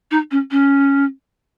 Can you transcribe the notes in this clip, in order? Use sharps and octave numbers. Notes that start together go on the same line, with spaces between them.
D#4
C#4
C#4